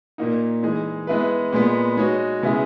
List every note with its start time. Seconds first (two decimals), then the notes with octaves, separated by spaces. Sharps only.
0.18 A#2 A#3 D#4
0.63 E3 G#3 D#4 G#4
1.07 G#3 B3 E4 G#4 B4
1.53 A#2 G#3 B3
1.97 G#3 D#4 F#4 C#5
2.42 C#3 G#3 B3 E4 G#4